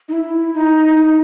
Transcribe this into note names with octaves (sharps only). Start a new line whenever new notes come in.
D#4
E4
D#4
D#4